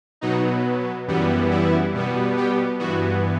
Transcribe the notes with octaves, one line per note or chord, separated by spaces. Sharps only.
B2 F#3 B3 D#4
F#2 E3 G3 B3
E4
B2 G3 B3
G4
G2 E3 B3 F#4